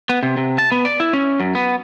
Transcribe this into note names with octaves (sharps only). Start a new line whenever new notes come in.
B3
C3
C3
A5
B3
D5
E4
C#4
F#2
B3